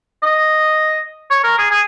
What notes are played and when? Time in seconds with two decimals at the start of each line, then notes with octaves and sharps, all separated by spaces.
0.23 D#5
1.30 C#5
1.44 A#4
1.58 G#4
1.71 G#4